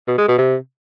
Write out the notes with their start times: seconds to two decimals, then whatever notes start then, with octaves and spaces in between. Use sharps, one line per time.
0.08 B2
0.18 G#3
0.28 B2
0.38 C3